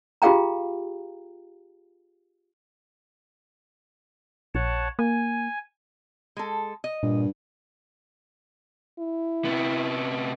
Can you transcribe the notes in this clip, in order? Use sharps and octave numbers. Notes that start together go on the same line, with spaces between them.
F4 G4 G#4 F5 G5 A#5
A#1 C#5 F#5 A5
A#3 G#5
G#3 A4
D#5
G2 A#2
E4
C3 B3